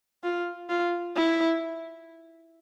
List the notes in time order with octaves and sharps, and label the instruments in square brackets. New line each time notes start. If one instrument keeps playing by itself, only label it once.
[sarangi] F4
F4
E4